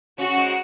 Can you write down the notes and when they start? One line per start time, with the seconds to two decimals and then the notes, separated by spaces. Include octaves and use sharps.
0.18 C#3 C#4 F#4
0.36 G#2 G#3